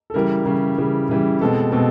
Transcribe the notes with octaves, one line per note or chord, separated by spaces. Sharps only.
A4
C#3 E3 G3 A#4
C#3 E3 G3
C#3 E3 G3
C#3 E3 G3
B2 G#3 C4 A4
B2 G#3 C4 A4